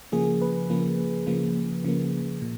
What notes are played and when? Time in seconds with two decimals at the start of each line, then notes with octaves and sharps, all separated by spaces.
0.12 C#3 F3 A#3 G#4
0.41 B4
0.70 C#3 F3 A#3
1.27 C#3 F3 A#3
1.85 C#3 F3 A#3
2.42 A#2